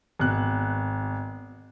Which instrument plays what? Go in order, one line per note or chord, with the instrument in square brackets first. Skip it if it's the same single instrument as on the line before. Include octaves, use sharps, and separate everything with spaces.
[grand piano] G#1 B2 F#6